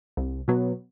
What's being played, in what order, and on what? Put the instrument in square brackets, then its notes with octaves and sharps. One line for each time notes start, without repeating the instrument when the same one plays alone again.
[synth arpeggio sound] C2
B2 F#3 B3